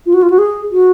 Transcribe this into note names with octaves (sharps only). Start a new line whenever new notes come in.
F4
F#4
F4
F#4
G#4
F#4